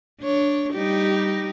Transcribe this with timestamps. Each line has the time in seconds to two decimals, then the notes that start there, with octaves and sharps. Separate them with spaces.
0.21 D4 C#5
0.73 G3 D#4 G4